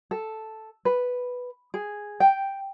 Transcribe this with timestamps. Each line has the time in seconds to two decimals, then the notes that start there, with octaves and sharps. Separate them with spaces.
0.11 A4
0.85 B4
1.74 G#4
2.20 G5